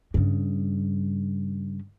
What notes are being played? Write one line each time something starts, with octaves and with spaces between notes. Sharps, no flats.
G2 C#3